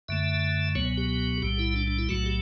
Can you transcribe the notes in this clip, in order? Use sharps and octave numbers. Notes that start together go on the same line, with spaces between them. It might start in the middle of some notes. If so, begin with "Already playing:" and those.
F#2 D3 A3 E5
C#2 B2 F#3 B3 C#5
G4
B1 A2 G3 G4
E4
D4
D4
E4
B1 A2 F#3 A3 F#4
G4